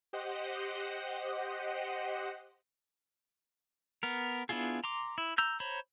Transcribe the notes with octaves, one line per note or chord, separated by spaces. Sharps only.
G4 C5 D#5 F#5
B3 A#4
B3 D4 E4 F4 G#4
A#5 C6 D6
E4
A#5 E6 G6
C5 C#5 A#5 B5